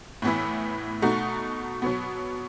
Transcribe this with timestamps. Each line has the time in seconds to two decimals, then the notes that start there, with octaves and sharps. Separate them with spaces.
0.22 A2 E3 B3 E4
1.02 B2 A3 D#4 F#4
1.82 B2 F#3 B3